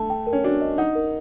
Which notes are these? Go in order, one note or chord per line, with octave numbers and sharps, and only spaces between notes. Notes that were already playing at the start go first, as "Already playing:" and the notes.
Already playing: A3 A5
G5
A#4
C#4
D4 F#4
D#5
D#4 F#5
A#4